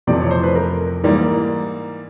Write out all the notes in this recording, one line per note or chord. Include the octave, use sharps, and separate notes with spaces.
F2 C3 E3 A3 D5
C#5
C5
B4
A#4
G#2 E3 G3 A#3